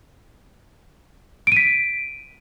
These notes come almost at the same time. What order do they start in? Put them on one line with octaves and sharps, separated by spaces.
D7 D#7 B6